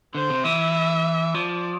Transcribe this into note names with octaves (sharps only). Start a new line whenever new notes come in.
D3 C5
C3
E3 E5
F3 D5